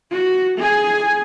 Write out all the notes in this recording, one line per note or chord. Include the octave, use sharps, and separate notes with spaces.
F#4
G#4 G#5